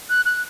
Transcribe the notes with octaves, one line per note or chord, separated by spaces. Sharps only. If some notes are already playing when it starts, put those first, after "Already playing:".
F#6
F#6